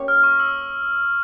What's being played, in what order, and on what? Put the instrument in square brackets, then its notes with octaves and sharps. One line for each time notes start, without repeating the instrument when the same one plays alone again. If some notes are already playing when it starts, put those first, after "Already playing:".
Already playing: [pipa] A#3 C#4 G4 C#5
[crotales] F6
C#6
E6